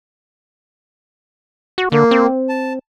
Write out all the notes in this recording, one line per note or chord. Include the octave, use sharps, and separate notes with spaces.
F#4
D3 A#3
C4
A5